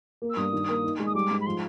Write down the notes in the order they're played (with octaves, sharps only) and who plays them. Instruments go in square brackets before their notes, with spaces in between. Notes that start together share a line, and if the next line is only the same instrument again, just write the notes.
[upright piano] A#3
[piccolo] E6
[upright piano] G2 [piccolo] D#6
[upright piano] D#3
A#3
D#4
G#3
[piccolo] D#6
[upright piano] G3 [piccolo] D6
[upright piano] G#2
[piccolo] B5
[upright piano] F3 [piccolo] C6